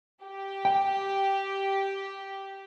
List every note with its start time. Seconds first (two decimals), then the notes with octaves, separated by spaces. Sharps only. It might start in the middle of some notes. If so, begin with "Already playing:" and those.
0.23 G4
0.65 G5